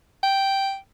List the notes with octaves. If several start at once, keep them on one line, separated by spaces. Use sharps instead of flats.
G5